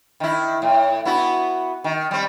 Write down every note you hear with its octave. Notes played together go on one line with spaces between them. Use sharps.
D#3 E4
A2
B3 E4 F#4
D#3
G3 C4